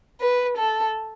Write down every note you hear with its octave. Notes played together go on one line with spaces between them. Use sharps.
B4
A4